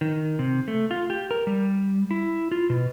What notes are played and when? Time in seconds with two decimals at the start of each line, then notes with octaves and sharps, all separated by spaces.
0.01 D#3
0.39 C3
0.68 A3
0.91 F4
1.10 G4
1.31 A#4
1.47 G3
2.11 E4
2.51 F4
2.70 B2